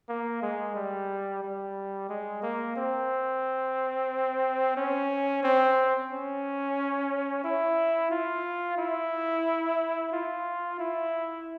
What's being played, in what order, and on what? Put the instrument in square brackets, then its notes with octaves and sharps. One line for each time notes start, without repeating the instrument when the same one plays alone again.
[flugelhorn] A#3
G#3
G3
G3
G#3
A#3
C4
C#4
C4
C#4
E4
F4
E4
F4
E4